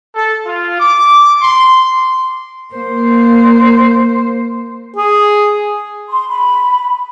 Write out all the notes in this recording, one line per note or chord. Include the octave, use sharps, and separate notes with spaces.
A4
F4
D6
C6
A#3 C5
G#4
C6
B5